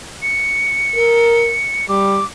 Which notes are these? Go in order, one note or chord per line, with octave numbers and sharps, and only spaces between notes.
C#7
A#4
G3 D6